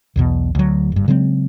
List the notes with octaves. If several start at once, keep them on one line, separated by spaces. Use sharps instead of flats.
B1 E2 B2
D2 F#3
F#1 G2
C#3 F#3 G#3 C4